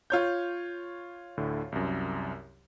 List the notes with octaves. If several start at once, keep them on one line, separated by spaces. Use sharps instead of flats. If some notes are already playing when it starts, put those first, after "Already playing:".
F4 C#5 G6
D2 A2 D3
C2 F#2